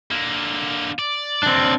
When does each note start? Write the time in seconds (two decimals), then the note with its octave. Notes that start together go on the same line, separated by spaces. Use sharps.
0.11 D3 A#3
0.99 D5
1.43 C4 D4